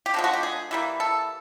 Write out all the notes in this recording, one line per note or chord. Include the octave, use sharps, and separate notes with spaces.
G4
D3 F3 G#3 F#4
F#4
G4
G#4
E3 G3 A#3
A4